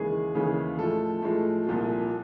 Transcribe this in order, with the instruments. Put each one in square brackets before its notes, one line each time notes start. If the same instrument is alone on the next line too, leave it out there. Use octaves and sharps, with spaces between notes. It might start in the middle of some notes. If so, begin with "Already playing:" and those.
Already playing: [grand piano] D#2 C#3 E3 G#3 G#4
D#2 C#3 E3 G#3
A2 F3 G#3 A4
A2 F3 G#3
C2 A#2 F3